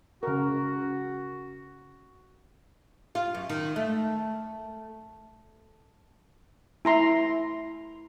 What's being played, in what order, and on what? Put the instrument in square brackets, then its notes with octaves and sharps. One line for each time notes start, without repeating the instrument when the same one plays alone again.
[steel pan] C#3 A#4 [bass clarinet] F#4
[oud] F4
F#2
D#3
A3
[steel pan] E4 A#5 C6